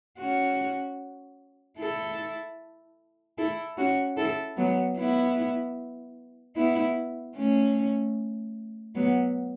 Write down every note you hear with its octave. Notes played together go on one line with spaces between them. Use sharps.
C#4 F#4
E4 A4
E4 A4
C#4 F#4
E4 A4
F#3 B3
B3 E4
B3 E4
A3 C#4
F#3 B3